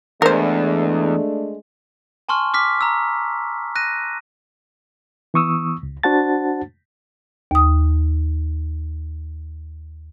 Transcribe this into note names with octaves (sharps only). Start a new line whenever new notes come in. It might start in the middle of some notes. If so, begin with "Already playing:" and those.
E2 G#3 A3 D4 A#4 C5
G#5 A5 C6 C#6 F6
D6 F6 B6
A#5 E6
F#6 A#6 D#7
E3 B3 C#6 D#6 E6
C#2
D4 F#4 C5 F#5 A5 A6
D#2 D#6